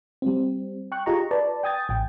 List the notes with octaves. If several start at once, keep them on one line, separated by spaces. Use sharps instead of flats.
G3 C4
G5 C#6 F#6
F4 G4 G#4 D#5 A#5 C#6
B4 D5 A5
G5 G#5 D#6 G#6 A6
A1 G5